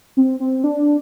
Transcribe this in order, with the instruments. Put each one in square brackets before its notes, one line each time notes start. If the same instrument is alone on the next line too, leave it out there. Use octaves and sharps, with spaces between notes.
[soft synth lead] C4
C4
D4